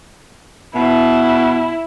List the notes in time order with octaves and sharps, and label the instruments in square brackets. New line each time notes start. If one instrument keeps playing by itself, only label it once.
[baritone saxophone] B2 [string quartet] E4